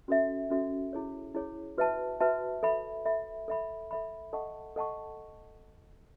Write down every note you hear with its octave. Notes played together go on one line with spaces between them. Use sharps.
C#4 F#4 A4 E5
C#4 F#4 A4 E5
E4 G#4 C#5
E4 G#4 C#5
F#4 B4 E5 A5
F#4 B4 E5 A5
A4 E5 B5
A4 E5 B5
A4 E5 B5
A4 E5 B5
A4 D#5 F#5 A5 C#6
A4 D#5 F#5 A5 C#6